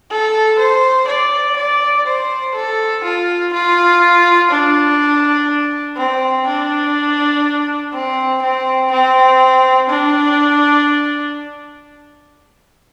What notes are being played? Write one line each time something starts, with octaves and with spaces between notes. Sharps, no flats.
A4
C5
D5
D5
C5
A4
F4
F4
D4
C4
D4
C4
C4
C4
D4